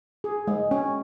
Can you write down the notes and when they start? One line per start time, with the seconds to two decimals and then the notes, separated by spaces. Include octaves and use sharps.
0.24 G#4
0.47 G#3
0.71 C#4